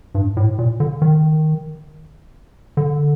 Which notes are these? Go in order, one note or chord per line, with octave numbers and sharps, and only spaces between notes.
G2
A2
A#2
D3
D#3
D3